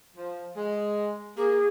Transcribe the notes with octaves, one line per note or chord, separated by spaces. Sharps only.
F3
G#3
A#3 G#4